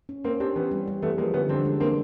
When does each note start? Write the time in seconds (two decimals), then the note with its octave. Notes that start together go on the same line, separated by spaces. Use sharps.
0.09 C#4
0.24 A#3 C4 C#4
0.40 C4 D4 G4
0.56 E3 B3 C#4
0.71 G3
0.88 G3
1.02 E3 A3 B3
1.18 F3 G#3 A#3
1.34 D3 B3 C#4
1.49 D3 C4 D4
1.65 G#3
1.80 A#3 C4 D4